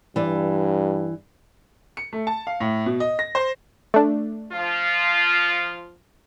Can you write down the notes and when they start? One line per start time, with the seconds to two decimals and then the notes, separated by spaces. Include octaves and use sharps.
0.16 G2 E3 D5
1.97 C#7
2.13 A3
2.27 A5
2.47 F5
2.60 A2
2.86 B2
3.00 D#5
3.19 A#6
3.35 C5
3.94 A3 D4
4.53 F3 F4